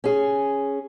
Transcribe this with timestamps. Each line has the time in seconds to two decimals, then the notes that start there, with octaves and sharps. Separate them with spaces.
0.04 C#4 G#4